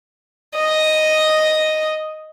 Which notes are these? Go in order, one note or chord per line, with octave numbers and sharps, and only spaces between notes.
D#5 D#6